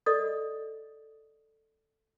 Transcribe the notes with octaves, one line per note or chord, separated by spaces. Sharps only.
A4 D5 D#5 D#6